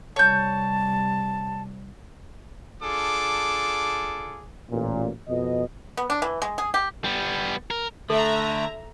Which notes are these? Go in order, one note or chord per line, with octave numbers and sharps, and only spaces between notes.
C3 G3 C#5 A5 G6
D4 F4 G#4 A4 D6
A1 A#2
F2 B2 D#5
B3
D4
E3
G#3
G#4
G4
G3 B3
A#4
D3 A3 A4 E5 A#5